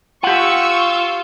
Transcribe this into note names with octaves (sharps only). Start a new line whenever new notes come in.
F4 G4 F#5 C#6 E6